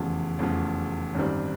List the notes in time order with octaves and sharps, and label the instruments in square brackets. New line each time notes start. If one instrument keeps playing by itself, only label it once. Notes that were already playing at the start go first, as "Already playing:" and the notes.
Already playing: [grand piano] F1 E2 C#3 F3
F1 E2 C#3 F3
G#1 F#2 D#3 G3 C4